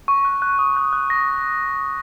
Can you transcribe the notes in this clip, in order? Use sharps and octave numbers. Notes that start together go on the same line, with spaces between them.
C#6
F#6
F#6
D#6
F#6
F#6
A#6